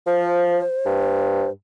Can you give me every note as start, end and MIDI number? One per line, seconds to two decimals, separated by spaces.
0.07 0.61 53
0.07 1.51 72
0.86 1.49 43